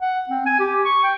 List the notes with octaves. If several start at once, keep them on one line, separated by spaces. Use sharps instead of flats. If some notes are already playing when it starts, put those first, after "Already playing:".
F#5
C4
G#5
G4
C#6
G5